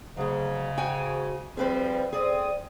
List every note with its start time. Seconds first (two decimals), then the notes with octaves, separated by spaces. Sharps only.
0.17 D2 G#2 C#3 F#3
0.78 F#4 G5 G#5
1.57 F3 G3 C4 G#4 B4 C5
2.13 C4 G#4 D5 D#6